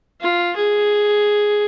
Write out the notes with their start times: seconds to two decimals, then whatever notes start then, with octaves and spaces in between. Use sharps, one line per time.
0.21 F4
0.56 G#4